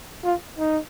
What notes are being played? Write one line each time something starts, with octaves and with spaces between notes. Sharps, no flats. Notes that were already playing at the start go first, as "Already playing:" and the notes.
F4
D#4